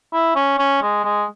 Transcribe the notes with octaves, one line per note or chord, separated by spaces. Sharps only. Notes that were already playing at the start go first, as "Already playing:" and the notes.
E4
C#4
C#4
G#3
G#3